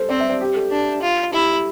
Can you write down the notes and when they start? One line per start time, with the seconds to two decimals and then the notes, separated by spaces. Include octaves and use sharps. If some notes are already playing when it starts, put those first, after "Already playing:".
Already playing: A4 C5
0.09 C4 D5
0.20 E5
0.29 D5
0.41 G4
0.55 A4
0.71 D4
1.02 F4
1.33 E4 G4